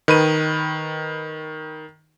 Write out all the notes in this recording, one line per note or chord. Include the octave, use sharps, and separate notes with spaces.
D#3 B4 D#7